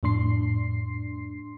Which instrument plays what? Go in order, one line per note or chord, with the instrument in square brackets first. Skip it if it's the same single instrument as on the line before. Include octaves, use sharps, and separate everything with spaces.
[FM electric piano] F2 A2 D4 C6 C7